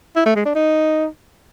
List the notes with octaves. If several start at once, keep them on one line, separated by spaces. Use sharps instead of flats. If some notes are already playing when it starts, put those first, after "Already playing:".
E4
A3
G#3
D4
D#4